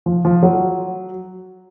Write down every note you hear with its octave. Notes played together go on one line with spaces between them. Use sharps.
F3
F3
F#3